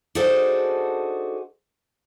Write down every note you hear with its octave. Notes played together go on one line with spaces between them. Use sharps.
D4 D#4 F#4 G#4 A4 C5